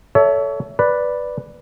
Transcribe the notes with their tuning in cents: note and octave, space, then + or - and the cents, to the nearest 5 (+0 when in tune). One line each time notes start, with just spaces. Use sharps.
A4 +0 C#5 +30 E5 +0
B4 +0 D5 +0